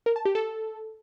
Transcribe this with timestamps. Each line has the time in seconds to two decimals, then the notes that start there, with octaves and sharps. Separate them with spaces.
0.06 A#4
0.16 A5
0.25 G4
0.35 A4